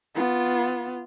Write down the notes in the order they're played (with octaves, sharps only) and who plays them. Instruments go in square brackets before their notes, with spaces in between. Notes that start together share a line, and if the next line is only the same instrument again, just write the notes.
[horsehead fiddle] B3 F4